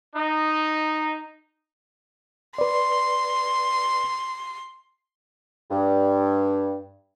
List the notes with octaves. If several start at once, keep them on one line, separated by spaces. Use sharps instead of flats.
D#4
B4 D5 C6
G2